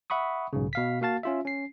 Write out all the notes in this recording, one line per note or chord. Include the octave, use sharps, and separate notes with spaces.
E5 F#5 B5 C#6 D#6
B1 G#2 C#3
B2 F5 B6
A#3 F#4 F5 A5 A6
C#4 F4 E5
C#4 C7